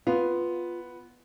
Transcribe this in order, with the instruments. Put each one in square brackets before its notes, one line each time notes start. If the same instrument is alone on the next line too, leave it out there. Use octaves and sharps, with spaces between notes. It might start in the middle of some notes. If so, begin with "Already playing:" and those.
[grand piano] B3 [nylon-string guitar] F4